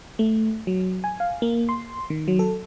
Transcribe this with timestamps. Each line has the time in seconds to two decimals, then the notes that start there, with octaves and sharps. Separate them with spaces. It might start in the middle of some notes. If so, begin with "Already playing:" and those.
0.19 A3
0.67 F#3
1.04 G#5
1.20 F5
1.42 A#3
1.69 C6
2.10 D#3
2.28 F#3
2.39 A4